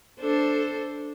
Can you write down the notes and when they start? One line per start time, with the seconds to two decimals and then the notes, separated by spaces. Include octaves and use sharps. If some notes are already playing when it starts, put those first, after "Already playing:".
0.20 D4 A4 C5